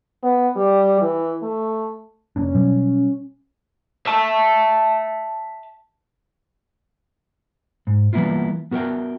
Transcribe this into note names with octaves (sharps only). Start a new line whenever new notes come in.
B3
G3
E3
A3
F1 A#3 C#4 D4
B2 F#3 G3
E5 A5
G#2
E3 G3 A#3 B3 E4 F4
B3 F#4 A#4 E5 G5